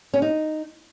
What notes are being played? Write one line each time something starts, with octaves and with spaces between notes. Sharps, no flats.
C#4
D#4